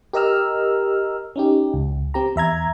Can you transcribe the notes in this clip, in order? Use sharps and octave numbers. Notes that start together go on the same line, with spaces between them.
G4 A#4 D#5 A#5 E6 F6
C#4 D#4 G4
C#2
C4 G4 A#5
E2 E5 A#5 G#6